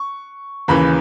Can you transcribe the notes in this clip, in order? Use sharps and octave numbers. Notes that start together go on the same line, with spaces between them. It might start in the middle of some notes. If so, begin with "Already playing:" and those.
Already playing: C#6
D#2 C#3 E3 B5